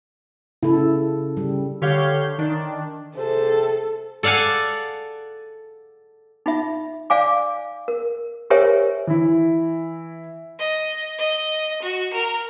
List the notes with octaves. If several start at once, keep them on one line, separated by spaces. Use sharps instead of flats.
C#3 E4 A4
C#3 G3
D3 G4 C#5 F5 G6
D#3 D4
C3 G#4 A4 C5
A4 D5 F5 F#5 G#5
D#4 F4 E5
D5 F5 G#5 D6
A#4
G4 A#4 C5 C#5 E5 G#5
E3 E4
D#5
D#5
F#4
A#4